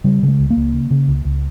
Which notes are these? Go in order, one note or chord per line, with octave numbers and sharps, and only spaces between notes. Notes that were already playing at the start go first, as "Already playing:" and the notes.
C#3 G3
C#3
G#3
C#2
A#3
C#2
C#3
C#3
C#2
C#2